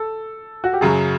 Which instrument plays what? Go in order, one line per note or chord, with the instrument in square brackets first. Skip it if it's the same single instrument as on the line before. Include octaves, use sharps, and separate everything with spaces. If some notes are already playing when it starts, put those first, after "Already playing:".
Already playing: [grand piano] A4
F#4
G4
[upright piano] F#2 C#3 F#3 [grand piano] G#4